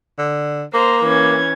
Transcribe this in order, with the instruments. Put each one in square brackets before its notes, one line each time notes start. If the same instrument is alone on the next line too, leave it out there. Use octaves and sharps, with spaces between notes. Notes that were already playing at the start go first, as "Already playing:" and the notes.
[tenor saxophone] D3
[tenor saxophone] A#3 [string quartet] C5 A#5
[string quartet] E3 C#4 G#6